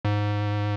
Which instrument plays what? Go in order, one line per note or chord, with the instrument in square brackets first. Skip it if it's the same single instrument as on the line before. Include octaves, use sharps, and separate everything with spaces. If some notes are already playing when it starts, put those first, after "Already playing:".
[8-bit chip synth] G#2